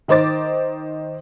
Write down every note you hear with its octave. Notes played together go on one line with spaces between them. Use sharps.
D#3 D#4 C5 D6 A6